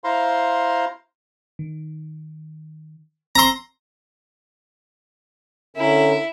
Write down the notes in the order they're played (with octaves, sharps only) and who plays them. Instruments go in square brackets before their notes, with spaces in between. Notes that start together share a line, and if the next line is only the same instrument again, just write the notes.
[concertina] E4 C5 F5 A#5 C6
[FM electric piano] D#3
[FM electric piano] C4 E6 C7 [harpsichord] A#5 C6
[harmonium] D3 C#4 A#4 [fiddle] E4